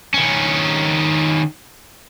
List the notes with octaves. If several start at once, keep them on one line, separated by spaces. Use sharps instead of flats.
D#3 C#4